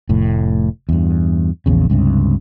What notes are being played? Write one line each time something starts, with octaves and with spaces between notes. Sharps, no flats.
F1 A2
E2 G2
A#1 E2 C#3
C#2 G2 C3